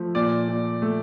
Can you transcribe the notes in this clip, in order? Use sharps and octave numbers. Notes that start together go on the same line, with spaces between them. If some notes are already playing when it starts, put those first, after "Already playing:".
Already playing: F3 A3
A#2 D5
A#2
A3